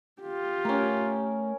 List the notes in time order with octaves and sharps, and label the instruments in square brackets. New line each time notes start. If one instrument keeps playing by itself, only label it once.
[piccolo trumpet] F4 [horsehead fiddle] G4
[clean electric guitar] A3 G5 [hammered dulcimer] C#4 A#4